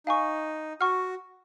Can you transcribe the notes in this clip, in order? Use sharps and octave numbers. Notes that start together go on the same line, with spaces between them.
D#4 F5 G#5 C#6
F#4 F#5 C#6 F6